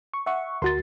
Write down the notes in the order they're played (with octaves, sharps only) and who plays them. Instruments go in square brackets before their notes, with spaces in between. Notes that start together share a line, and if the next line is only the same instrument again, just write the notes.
[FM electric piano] C#6
E5 F#5 C#6
[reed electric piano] D2 F#4 A6 [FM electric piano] A#4 C6